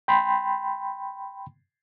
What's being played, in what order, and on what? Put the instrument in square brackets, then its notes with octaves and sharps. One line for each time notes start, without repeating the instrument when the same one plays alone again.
[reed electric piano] G5 B5 C6